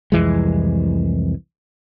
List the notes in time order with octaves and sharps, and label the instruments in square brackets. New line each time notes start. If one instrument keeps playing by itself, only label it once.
[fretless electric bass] C2 F2 E3 G#3